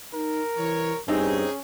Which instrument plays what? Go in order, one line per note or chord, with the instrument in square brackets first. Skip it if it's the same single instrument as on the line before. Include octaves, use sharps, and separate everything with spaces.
[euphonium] D#4 [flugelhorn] A#4
[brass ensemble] C2 C#5 [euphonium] E3
[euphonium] G2 [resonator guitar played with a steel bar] C4 D#4 [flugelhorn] C#4 [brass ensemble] G#4